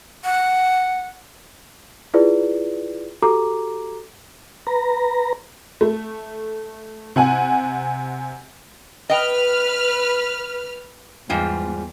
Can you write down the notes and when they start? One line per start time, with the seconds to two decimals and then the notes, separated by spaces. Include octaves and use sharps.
0.24 F#5
2.14 E4 F4 G#4 B4 D5
3.22 F#4 G4 A4 A#5 D6
4.67 B4 A#5
5.81 A3
7.16 C3 F#5 G#5
9.10 B4 D#5 G5 F6
11.29 E2 G#2 G3 F4